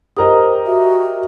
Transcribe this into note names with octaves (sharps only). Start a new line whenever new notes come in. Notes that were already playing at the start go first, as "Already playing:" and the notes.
G4 A#4 C5 D#5 D#6
F#4 E5